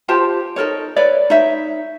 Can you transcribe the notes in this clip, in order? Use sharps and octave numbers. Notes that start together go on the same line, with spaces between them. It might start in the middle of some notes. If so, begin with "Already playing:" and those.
F4 G4 C5 A5
D#4 A4 A#4 C#5
A4 B4 C#5 D5
D#4 C#5 E5